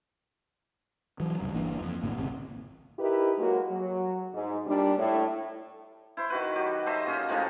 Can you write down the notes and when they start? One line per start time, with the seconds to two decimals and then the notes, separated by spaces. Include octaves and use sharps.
1.20 E3 F#3
1.40 E1 C#2 G2
1.54 G1 E3 A#3 D4
1.80 F2
2.03 A#1 A2 D3 A#3
2.16 D1 G#1 C#2 C3
2.99 D#4 E4 G4 A#4 B4
3.38 F#3 G#3 A#3 F#4
3.71 F#3
4.33 G#2
4.66 A#2 G3 D4
4.98 A2
6.17 E4 C5
6.30 D#3 F#4 B4
6.55 F#3 G4
6.86 A4 C5 D#5 E5
7.06 A#2 C#4 D#5
7.29 A2 F3 G#3 D#4